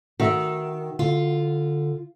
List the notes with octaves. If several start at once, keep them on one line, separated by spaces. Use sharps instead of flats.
D#3 F#4 E5
D3 F4